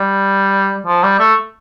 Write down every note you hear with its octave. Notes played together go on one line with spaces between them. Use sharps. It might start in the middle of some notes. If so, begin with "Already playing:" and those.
Already playing: G3
F3
G3
A3